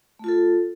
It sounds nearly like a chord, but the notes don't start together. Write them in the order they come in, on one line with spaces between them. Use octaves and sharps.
A3 F4 A4